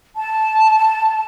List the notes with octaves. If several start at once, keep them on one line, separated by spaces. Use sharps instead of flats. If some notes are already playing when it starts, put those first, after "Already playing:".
A5